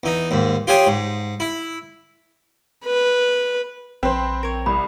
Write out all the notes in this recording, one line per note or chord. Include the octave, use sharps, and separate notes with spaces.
E2 D#4
D#2 G#2
F4 G4 G#4 C#5 A5
G#2
E4
B4
A#1 C4 B4 C5 C6
A#4 C#5
C2 B5